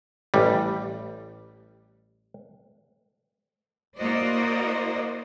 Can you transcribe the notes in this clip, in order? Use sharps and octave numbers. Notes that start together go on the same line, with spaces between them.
A1 G3
A#3 E4 F#4 C5 D5 D#5